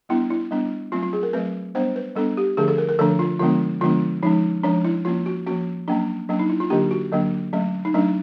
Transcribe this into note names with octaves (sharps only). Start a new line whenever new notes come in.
G3 B3 D4 E4
E4
G3 B3 D4
F#3 A3 C4 F4
F4
G#4
A#4
F#3 A3 C4 B4
G3 B3 D4 C5
B4
G3 B3 D4 A4
G4
D3 F3 A3 D4 G#4
A4
A#4
A#4
D3 F3 A3 D4 A4
F4
D3 F3 G#3 B3 D4 F4
D3 F3 G#3 B3 D4 F4
F3 G#3 C#4 D#4
F3 G#3 C#4 D4
E4
F3 A#3 C#4 F4
F#4
F3 A#3 C#4 F#4
F#3 A#3 C#4 D4
F#3 A#3 C#4 D4
D#4
E4
F4
D3 F#3 A#3 D4 G4
F#4
D3 F#3 A#3 D4
F#3 A3 C#4
D#4
F#3 A3 C#4 D4